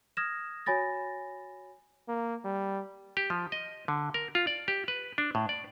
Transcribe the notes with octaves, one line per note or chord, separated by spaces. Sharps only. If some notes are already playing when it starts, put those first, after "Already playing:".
D#6 F6 G#6 A#6 E7
F#4 C#5 G#5 B5 A6 A#6
A#3
G3
G4
F3
D#5
D3
A#4
F4
D5
G4
B4
D4
A2
D5